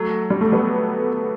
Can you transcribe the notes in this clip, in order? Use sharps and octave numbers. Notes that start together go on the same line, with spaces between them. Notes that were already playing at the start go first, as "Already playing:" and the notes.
Already playing: F#3 A3
G3
A3
G3 B3